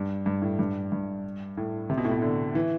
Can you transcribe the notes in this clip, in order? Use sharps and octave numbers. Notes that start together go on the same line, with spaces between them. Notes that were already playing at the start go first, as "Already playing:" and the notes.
Already playing: G2
G2
A2
G2
G2
A2
C3
B2
A2
B2
D3
E3